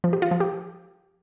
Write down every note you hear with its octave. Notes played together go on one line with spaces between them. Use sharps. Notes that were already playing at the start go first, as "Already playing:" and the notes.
F3
G4
F4
F3
G4